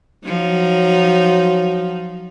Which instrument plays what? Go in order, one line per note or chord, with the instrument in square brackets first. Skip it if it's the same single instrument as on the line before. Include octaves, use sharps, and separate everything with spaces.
[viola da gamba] F3 D#4 [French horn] F#3